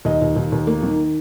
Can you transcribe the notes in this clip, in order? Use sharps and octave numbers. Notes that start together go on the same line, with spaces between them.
D#2 D#5
D#2
D#2
D#2
A#3
D#3